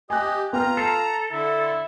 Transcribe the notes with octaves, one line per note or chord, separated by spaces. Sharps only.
G4 D#5 G#5 F#6
B3 F4 G5 A#5 F6
A4 C7
D3 E4